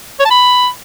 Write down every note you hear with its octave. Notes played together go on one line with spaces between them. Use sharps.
C#5
A5
B5